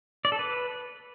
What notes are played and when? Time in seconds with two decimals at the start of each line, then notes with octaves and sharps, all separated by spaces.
0.25 D5
0.32 A4
0.39 B4